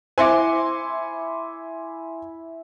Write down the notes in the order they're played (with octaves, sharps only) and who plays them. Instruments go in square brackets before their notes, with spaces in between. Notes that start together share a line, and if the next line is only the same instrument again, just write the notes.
[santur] E4 D6 [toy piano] C5 E5 [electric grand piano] G#5 C6 C#7